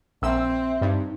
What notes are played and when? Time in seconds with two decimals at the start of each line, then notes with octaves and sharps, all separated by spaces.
0.22 A#1 C4 E5 E6
0.81 G2 D#4